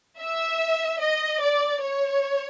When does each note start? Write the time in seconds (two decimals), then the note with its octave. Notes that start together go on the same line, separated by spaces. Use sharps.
0.20 E5
1.01 D#5
1.41 D5
1.82 C#5